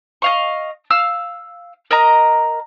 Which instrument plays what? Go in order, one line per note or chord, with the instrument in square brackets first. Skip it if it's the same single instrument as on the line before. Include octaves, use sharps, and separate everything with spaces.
[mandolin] D#5 F5 C#6
F5 E6 F6
A#4 D#5 A#5